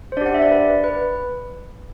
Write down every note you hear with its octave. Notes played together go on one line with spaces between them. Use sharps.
C5
D4 G4 D5 F#5
E5
D5
B4
B4